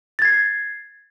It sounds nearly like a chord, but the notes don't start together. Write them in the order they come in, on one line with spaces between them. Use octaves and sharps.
A6 G#6 C7